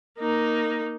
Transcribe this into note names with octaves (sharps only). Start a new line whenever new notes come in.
A#3 D#4